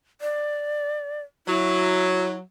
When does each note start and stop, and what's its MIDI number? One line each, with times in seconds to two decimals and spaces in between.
0.21 1.21 74
1.47 2.40 54
1.47 2.34 64